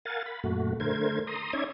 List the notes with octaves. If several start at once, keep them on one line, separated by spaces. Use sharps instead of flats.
A#4 F5 F#5 G#5 A6
B5
F#2 A#2 A3 F#4
D3 A3 A#4 C5 G#6
A#5 C6 D#6
C#4 D#4 C#5 D5 E5 G#6